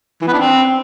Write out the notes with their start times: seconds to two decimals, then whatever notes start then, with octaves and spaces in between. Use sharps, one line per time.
0.22 E3
0.28 B3
0.33 D4
0.39 C4